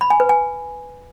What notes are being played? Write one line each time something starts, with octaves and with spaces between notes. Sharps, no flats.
B5
G#5
B4
G#5